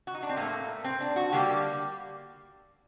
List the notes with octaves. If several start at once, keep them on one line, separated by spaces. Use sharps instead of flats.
F#4
D#4
D4
C4
A2 A3 A#3
C4
D4
F#4
D3 G3 A#3 G4